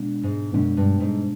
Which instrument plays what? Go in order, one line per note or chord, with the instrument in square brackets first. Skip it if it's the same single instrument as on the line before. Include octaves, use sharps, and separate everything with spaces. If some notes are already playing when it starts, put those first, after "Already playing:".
Already playing: [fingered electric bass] B2 G#3 B3 D4
[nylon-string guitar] G#2
[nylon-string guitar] F#2 [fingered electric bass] B2 G#3 B3 D4
[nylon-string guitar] G2
G#2